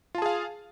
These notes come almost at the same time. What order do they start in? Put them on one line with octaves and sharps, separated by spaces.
F4 A5 G#4 F5